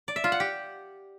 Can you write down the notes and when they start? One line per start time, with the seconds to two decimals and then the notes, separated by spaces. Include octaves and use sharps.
0.08 D5
0.16 E5
0.24 F4
0.32 F#5
0.40 G4